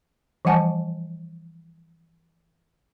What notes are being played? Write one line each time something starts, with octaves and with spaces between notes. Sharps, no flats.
E3 F3 G3 F#5 G#5 A5